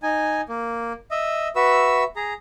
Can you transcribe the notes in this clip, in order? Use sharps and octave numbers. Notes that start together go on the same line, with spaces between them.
D#4 G#5
A#3
D#5 E5
F#4 B4 E5 E6
G#4 A#5